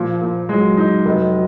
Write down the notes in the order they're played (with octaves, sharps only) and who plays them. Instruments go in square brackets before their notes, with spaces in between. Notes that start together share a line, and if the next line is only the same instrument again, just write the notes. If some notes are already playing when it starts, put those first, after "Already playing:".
Already playing: [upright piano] A#2 [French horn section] F3
[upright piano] A#2
[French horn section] F#3 [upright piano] G#3
[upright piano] D#4
F1